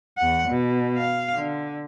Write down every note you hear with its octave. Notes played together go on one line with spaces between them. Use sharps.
E2 F#5
B2
F5
D3